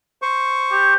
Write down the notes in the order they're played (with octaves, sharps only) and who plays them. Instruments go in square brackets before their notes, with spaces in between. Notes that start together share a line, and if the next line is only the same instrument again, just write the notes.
[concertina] C5 C#6
[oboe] G4